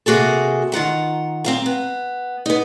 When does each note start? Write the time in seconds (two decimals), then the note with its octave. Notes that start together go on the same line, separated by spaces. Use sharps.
0.06 C3 A#3 F#4 G#4 A4
0.72 D#3 F4 F#5 A#5
1.44 C4 F5 A#5
1.66 B3
2.46 B3 D#4